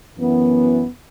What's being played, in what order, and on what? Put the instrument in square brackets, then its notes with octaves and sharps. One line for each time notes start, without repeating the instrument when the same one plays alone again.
[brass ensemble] F#2 E3 B3